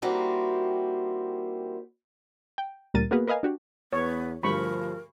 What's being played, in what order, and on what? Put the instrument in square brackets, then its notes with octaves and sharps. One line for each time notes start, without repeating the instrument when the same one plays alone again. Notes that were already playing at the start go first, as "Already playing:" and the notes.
[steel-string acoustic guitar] D#2 G3 A#3 C4 E4 F#4
[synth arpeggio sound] G5
D2 A#2 G3 A#4 A6 D#7
A#3 B3 F#4 G#4 A#4 B4
A#4 B4 D#5 F5 G#5
D4 F#4 G4
[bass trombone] E2 [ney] B3 [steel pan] C#5
[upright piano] D2 G2 [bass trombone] F3 [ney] A#4 [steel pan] B5 C#6